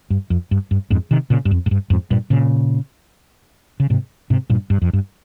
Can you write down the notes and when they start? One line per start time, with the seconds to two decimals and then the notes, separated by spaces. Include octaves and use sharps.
0.10 G2
0.30 F2
0.51 G2
0.71 G2
0.90 F2 G#2
1.11 C3 D#3
1.30 A#2 C#3
1.45 G2
1.51 F2
1.66 G#2
1.71 G2
1.90 F2 G#2
2.11 G2 A#2
2.30 A#2 C#3
3.80 C#3
3.90 G#2 C3
4.30 G#2 C3
4.50 G2 A#2
4.70 G2
4.82 F2
4.93 G2